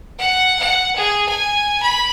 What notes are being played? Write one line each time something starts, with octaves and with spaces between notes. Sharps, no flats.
F#5
F#5
G#4
G#5
B5